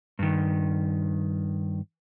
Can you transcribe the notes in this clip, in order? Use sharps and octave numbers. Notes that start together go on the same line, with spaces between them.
G2 D#3